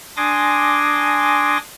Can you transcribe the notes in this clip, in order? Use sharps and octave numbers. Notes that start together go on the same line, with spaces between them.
D4 G#5 C6 D6 D#6 A#6